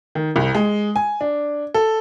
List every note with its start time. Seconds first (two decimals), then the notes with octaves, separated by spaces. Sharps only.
0.15 D#3
0.36 C2
0.55 G#3
0.96 G#5
1.21 D4
1.74 A4